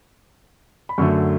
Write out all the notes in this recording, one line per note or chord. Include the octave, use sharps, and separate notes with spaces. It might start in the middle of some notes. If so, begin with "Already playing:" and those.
B5
F#2 D3 F#3 A3 C#6